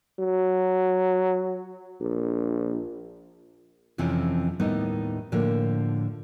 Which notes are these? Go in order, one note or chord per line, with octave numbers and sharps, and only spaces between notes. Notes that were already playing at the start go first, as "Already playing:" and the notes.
F#3
A#1
F2 C3 E3 F3 C4 C#4
D#2 A2 G3 B3 D#4 D#5
A2 D3 F3 A#3